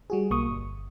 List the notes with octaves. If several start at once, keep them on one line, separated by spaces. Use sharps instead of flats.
G3 F#4 G#4
B1 A#3 C#6 D#6
G1